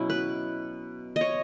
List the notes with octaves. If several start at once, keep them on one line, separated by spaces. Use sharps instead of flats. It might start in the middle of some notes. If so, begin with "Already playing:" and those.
Already playing: B2 F#3 C#4 E4
B4
D#5
C#5